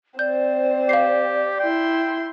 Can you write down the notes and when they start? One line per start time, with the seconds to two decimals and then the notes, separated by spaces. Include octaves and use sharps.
0.19 C4 C5 D5 G6
0.89 G4 F5 C7
1.60 E4 G5 C6